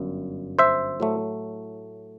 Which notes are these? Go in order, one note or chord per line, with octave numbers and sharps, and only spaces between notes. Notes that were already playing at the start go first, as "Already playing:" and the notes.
Already playing: G1 F#2
C5 E5
A2 F#3 A3